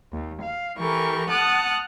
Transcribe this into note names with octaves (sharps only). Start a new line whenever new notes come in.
D#2
F5
E3 G4 A4 A#4 C#6
F#5 A5 D#6 F6 F#6